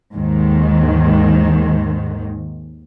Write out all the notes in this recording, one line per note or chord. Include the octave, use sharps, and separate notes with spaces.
D#2 G#2 D#3